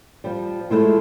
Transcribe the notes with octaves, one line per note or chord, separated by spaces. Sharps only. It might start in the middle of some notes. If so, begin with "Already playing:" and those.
F3 G3
F3 G#3 A3 E4 F4